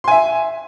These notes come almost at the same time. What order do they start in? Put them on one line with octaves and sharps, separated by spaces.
C6 G#5 E5